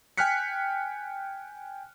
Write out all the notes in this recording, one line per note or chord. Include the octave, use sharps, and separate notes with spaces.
G5 G#5 F6 F#6 B6 C#7